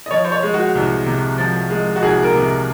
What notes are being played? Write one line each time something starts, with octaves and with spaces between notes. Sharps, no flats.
D#5
F3 C#5
C5
C#5
G#3
F#4
C2
C3
F3
G#3
F#4
C2 G#4
A#4
C3